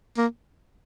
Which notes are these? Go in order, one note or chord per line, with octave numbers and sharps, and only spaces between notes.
A#3